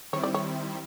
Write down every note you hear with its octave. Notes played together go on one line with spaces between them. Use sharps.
D#3 G3 C4 E4 C#5
D5
C#5